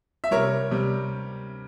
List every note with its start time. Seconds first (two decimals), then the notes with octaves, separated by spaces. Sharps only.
0.24 E5
0.31 C3 G3 A#4 C#5
0.71 C3 G3